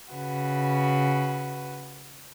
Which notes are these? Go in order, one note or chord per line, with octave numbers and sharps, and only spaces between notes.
C#3 F#4 B4